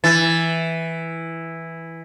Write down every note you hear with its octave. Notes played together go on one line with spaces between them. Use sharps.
E3 A6